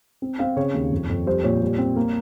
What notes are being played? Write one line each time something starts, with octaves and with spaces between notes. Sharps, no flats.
C4
C4 F5
C#3 C#5
D#2
F2
F2
G3 C5
A#2 C#5
G3
C4
A#3